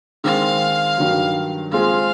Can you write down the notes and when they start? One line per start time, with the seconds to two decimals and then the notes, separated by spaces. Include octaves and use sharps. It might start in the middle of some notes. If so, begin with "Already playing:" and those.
0.24 D#3 G#3 C4 F5
0.98 G2 D#3 F#3
1.72 G#3 C4 F4 G#4 F5